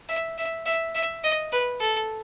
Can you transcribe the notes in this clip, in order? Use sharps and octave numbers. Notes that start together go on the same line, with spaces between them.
E5
E5
E5
E5
D#5
B4
A4